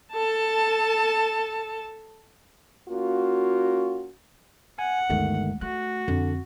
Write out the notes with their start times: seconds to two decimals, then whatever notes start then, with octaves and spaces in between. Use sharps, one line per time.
0.13 A4 A5
2.89 A#3 C#4 F4 F#4
4.79 F#5 G#5
5.10 G1 D2 D#3 G#3 A3
5.61 A3 F#4 F#6
6.08 F2 D3